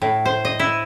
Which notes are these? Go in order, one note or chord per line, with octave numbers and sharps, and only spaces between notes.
A2
C5
D#5
E4